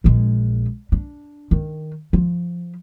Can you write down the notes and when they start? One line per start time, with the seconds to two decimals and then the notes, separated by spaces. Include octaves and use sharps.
0.04 A#1 G#3
0.92 D4
1.51 D#3
2.13 F3